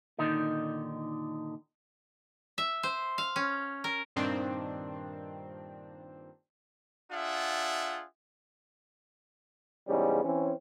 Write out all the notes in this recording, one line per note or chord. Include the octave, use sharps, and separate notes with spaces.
A#2 D3 D#3 D#4
E5
C5
F5
C#4
A#4
G2 A#2 D#3 C4 D4
D4 F4 G#4 E5 F#5
E2 G#2 C#3 G3 C#4
E3 C4 C#4